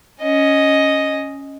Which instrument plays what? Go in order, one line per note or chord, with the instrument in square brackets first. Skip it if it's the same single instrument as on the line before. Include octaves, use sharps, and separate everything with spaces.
[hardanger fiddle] C#4 D#5